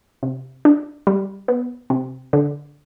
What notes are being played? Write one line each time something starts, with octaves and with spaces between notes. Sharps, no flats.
C3
D4
G3
B3
C3
D3